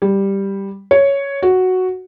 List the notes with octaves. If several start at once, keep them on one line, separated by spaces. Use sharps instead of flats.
G3
C#5
F#4